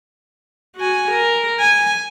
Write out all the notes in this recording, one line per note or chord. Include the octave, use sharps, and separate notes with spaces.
F#4 G#5
A#4
G#5